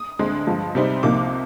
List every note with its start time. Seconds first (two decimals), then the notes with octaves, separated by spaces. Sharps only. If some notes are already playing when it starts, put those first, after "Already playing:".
Already playing: D#6
0.19 D2 D3 G#3 C4
0.47 G2 F3 G#3
0.75 C3 G3 C4 D#4
1.03 C2 C3 F3 A#3 D#4 D6